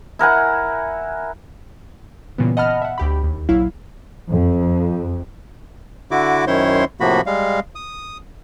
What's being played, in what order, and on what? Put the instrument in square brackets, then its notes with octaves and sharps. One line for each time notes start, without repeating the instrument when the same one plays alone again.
[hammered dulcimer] E4 A#4 F#5 G#5
[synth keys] A#2 C#3 E3 G3 B3
D#5 F#5 A5 B5 F6
E5 F#5
D2 G4 B5
D#2
A#1 F#3 E4 F5
[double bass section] F2
[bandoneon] D3 E4 F#4 D6
F#2 D#3 E4 C5 C#5 C6
A2 C3 F3 A#3 F#4 B5
G3 G#3 F5
D#6